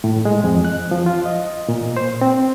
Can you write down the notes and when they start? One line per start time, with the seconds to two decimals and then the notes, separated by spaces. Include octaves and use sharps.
0.04 A2
0.25 G#3
0.44 F2
0.65 F#6
0.91 F3
1.06 F4
1.26 D#5
1.69 A#2
1.97 C5
2.21 C4